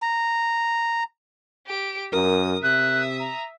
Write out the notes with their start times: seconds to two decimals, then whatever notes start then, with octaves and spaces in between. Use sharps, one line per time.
0.02 A#5
1.66 G4 D7
2.13 F#2 A#4 D#6
2.63 C3 E5 D#6 F#6
3.20 A#5